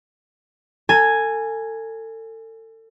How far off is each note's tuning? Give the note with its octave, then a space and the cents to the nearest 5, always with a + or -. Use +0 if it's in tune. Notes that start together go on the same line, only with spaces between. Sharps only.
A4 +35 G#5 +0